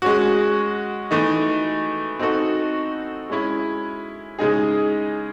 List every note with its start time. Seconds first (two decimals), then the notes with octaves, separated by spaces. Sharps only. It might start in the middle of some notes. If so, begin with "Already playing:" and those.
0.02 G#3 C#4 F#4
1.11 E3 A3 D#4
2.19 C4 D#4 F#4 A4
3.30 G#3 C#4 E4
4.39 C#3 G#3 D#4 G#4